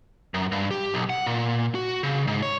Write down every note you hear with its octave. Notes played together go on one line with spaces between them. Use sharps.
F#2
G2
G4
B1
F#5
A#2
F#4
C#3
G#2
C#5